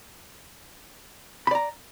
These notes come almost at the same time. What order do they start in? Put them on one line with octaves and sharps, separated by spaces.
B5 D5 A#5